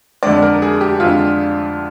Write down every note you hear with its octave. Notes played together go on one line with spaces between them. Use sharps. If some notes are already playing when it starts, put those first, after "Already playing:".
F2 D3 G#3 D4 D5
A#4
G#4
G4
F2 D3 G#3 D4 F4